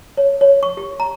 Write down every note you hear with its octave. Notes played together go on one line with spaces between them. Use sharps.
C#5
C#5
C#6
G4
A#5